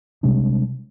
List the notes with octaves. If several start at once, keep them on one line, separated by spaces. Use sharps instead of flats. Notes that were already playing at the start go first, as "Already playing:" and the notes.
C3 G3 G#3 D4